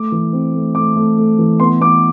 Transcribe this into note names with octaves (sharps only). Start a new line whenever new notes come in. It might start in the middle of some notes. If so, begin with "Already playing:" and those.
Already playing: A3 D6
E3
C4
A3
A3 D6
A3
A3
E3
B3 C6
B3 D6